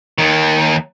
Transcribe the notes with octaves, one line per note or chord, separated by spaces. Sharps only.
D#2 D#3